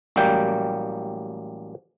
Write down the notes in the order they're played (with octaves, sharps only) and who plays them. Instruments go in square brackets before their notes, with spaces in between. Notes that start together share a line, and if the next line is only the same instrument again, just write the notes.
[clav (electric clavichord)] A1 F#3 G3 A#3 G5